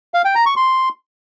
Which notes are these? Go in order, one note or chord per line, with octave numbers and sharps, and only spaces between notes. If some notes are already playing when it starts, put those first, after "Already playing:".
F5
G5
A#5
C#6
C6